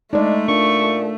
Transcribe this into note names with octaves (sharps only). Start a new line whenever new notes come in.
G#3 A3 D4 D#4 D5
A#2 D4 C#6